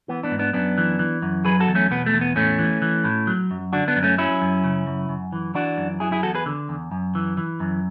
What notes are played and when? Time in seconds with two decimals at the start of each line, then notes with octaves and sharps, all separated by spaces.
0.08 E3 B3
0.23 B3 D4
0.31 G#2
0.39 B3 D4
0.53 F#2 B3 D4
0.78 E3
0.99 E3
1.22 F#2
1.45 F#3 G#4 B4
1.60 F#4 A4
1.68 E2
1.75 A3 C#4
1.91 B2 B3
2.06 A3
2.13 E2
2.21 B3
2.36 A2 A3 C#4
2.59 E3
2.82 E3
3.04 A2
3.27 F#3
3.51 F#2
3.73 D3 D4 F#4
3.88 B3 D4
3.96 F#2
4.03 A3 C#4
4.18 F#3 C#4 E4
4.42 F#2
4.64 C#3
4.87 F#2
5.09 F#2
5.33 E3
5.54 E3 D4 F#4
5.78 F#2
6.00 F#3 E4 G#4
6.12 E4 G#4
6.23 E2 F#4 A4
6.35 G#4 B4
6.46 D3
6.69 E2
6.91 F#2
7.15 E3
7.37 E3
7.60 F#2